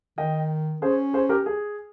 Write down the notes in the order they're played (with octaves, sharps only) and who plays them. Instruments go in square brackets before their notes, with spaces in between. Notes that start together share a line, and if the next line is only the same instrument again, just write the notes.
[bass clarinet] D#3 [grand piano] D#5 G5
[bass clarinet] C#4 [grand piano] G#4 C5
[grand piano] G#4 C5
G4 A#4
G#4